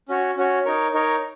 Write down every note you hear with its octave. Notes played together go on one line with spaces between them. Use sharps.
C#4 F#4 C#5
C#4 F#4 C#5
D#4 A#4 C#5
D#4 A#4 C#5